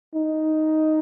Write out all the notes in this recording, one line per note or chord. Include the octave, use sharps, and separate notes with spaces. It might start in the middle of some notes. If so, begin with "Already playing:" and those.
D#4